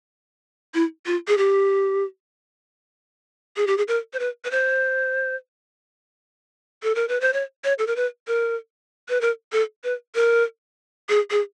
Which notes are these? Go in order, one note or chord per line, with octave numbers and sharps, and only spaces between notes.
E4
F4
G#4
G4
G#4
G4
G#4
A#4
C5
B4
B4
C5
A4
A#4
B4
C5
C#5
C#5
A4
A#4
B4
A#4
B4
A#4
A4
B4
A#4
G#4
G#4